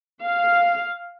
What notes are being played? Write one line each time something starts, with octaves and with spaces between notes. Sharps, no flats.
F5